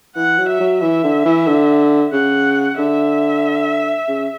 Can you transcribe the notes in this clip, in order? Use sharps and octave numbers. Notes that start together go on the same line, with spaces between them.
E3 F#5
F#3
E5
F#3
E3 E5
D3
E3
D3
C#3 F#5
D3 E5
C#3